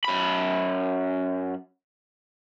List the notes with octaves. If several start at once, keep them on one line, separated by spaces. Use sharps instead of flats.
F#2 B5